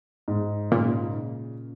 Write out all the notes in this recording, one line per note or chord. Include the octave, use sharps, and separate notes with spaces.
G#2
A#2 C#3